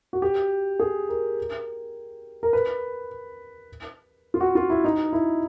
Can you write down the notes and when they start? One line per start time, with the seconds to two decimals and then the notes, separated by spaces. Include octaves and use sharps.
0.13 F#4
0.22 G4
0.79 G#4
1.09 A#4
2.43 A#4
2.53 B4
4.34 F4
4.41 F#4
4.55 F4
4.70 E4
4.84 D#4
5.13 E4